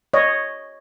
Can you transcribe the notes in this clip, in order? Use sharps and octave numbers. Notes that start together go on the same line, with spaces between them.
C#5 D#5